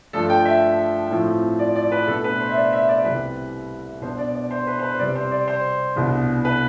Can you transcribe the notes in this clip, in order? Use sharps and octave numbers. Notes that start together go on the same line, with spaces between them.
G2 F3 A3 D4 A4
G5
E5
A2 F3 C4
D5
D5
B4
B2 A3 D4 A4
B4
C5
E5
D5
E5
D5
C2 C3 G3 B4
B2 B3 D4 C5
D5
D5
C5
B4
C5
B4
C3 G3 C4 D5
C5
D5
C5
C2 B2 B3 D4
B4